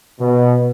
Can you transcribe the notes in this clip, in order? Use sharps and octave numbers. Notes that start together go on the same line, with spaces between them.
B2